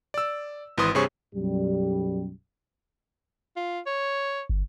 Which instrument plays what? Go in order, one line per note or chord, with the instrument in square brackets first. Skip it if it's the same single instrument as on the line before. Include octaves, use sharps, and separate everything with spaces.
[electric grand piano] D5 E6
G#1 E3 B4 C6 D#6
G2 C3 C4 G#4 C#5 C#6
[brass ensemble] B1 F#2 G3
[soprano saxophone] F4
C#5
[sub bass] G1